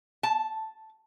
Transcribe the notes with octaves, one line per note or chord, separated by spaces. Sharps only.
A5